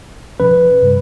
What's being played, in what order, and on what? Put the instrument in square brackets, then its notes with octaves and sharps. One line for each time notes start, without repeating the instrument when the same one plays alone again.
[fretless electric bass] B2 F3 C#4 [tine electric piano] B4
[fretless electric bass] G2 C3 G3